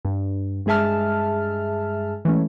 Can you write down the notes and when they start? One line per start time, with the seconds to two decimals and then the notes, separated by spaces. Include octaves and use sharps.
0.05 G2
0.66 G2 G#3 G#4 E5 A5 F6
2.25 E3 G#3 A3 C#4